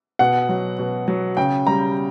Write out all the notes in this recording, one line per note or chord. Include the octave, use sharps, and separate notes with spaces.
B2 F#5
F#3
B2
F#3
C#3 G5
G3 A#5